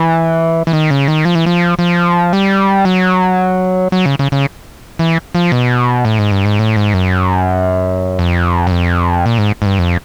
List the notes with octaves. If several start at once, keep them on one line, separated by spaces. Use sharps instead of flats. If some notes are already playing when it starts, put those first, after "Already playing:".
Already playing: E3
E3
D#3
C#3
D#3
F3
E3
F3
F3
G3
F#3
F#3
C#3
C#3
C#3
E3
F3
B2
A2
G#2
G2
G#2
A2
G#2
F#2
F2
F#2
F2
A#2
G#2
G#2
G2
F2